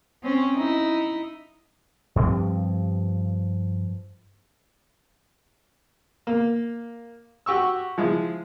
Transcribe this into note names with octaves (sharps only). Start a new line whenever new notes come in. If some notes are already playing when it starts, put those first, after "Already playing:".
C4 C#4
D#4 E4
G2 F3 C4
A#3
F#4 G4 C#6 E6
F3 G#3 E4